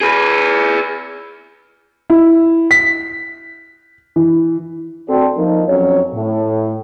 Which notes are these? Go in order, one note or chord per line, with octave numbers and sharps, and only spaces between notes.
G#4 B4
E4
B6
E3
D2 C4 F#4 A4 D5
F3 A#3 D#4
F2 F#3 C#4 C#5
A2